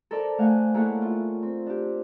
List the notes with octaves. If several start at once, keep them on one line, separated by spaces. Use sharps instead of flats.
A4 A#4 C5 D5
A3 F5 F#5 G#5
A#3 E4 G#4 A4 C#5 F#5
F4
C4
D4 G4